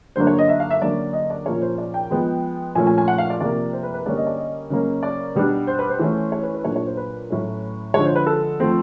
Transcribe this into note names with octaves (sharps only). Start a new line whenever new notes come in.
D3 F#3 A#3 D4 C5
C#5
D#5
E5
F5
E5
D3 F#3 A#3 C#4 D5
D#5
D5
A#2 F3 A#3 C#4 C#5
C5
D5
G5
F3 G#3 B3
A#2 F3 A3 C#4 G#5
G#5
G#5
F#5
F5
D5
C3 F3 A#3 D5
C5
B4
B4
D3 G3 A#3 C#4 D5
D#5
D5
D#5
C#3 F#3 A#3 C#4
D5
B2 G3 B3 D4
C5
B4
C5
E3 A3 C#4
C#5
B4
B4
A#2 F#3 A#3 D4 C#5
C#5
C5
B4
A2 F#3 A3 C#4
D3 F3 G#3 C#5
C5
B4
A4
F3 A3 C4